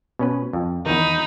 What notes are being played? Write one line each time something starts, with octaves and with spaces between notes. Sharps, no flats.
B2 C#4 B4
F2
E2 D#3 D#4 B5